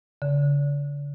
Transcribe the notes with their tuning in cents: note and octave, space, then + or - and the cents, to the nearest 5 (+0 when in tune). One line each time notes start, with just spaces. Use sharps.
D3 -45